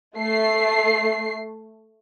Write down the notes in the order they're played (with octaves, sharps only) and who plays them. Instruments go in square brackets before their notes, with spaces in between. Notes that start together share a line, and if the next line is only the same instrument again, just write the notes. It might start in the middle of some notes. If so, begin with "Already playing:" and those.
[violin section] A3 C7